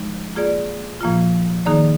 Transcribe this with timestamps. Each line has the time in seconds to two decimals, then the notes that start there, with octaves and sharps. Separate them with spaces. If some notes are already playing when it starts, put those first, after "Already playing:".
Already playing: F3 G#3 D#4
0.35 A#3 F4 G#4 D5
1.01 A#2 F3 A#3 F4
1.66 D#3 A#3 D#4 G#4 D5